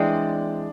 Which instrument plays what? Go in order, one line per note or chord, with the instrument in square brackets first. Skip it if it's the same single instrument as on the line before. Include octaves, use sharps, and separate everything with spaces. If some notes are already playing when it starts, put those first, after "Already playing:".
Already playing: [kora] E3 G#3 C4 [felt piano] D4 D5